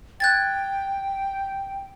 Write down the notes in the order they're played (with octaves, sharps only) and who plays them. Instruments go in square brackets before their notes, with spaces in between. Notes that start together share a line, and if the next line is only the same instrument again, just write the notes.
[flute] G5 [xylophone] F#6 G#6 A6